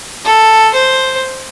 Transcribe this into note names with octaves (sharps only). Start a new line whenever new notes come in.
A4
C5